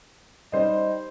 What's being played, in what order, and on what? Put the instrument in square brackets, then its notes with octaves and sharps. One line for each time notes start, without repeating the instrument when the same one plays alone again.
[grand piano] G3 D#4 C5 D#5